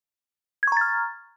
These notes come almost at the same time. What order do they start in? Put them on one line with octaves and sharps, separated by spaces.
G#6 C#6 A#5 A6 F6